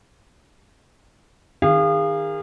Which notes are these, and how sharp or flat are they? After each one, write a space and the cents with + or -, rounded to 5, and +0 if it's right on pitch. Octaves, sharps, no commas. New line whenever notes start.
D#3 +0 G#4 -35 F5 -15